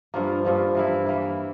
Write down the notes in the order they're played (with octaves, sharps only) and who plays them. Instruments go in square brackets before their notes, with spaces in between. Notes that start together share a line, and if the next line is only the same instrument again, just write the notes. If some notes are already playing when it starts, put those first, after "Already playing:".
[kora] G2 F3 A#3
G2 F3 A#3
E3 A#3 E4
E3 A#3 E4